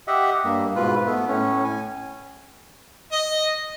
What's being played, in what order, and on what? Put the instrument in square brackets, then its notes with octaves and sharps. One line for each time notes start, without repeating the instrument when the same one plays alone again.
[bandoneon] G4 D#5 E5 F#5
G2 A#3
G#2 B2 F4 B4
A3 B3
A2 C#4
G#5
[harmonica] D#5